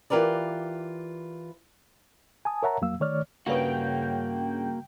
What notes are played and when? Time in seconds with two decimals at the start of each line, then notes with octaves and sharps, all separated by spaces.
0.10 E3 F4 G4 A#4 B4 D5
2.45 G#5 A5 D#6
2.63 A#4 C#5 E5 F#5 A5 A#5
2.81 F2 F#3 A#3 F5 E6
3.00 D#3 A3 C#5 D5 F6
3.47 G2 C#3 A#3 F#4 B4 F5 G5